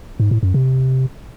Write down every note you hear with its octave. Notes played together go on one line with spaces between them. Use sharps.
G#2
A2
F#2
C3